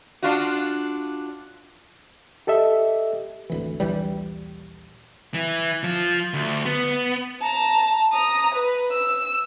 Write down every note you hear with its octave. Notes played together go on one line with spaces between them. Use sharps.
D4 F4 F#4
G4 A4 D#5 E5
G#1 D2 E3
A#1 D#2 E3 G3
E3
F3
D2
B3
A5 A#5
A#5 D#6
B4
E6